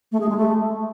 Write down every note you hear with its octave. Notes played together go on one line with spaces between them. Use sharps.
A3
G#4
G#3
A3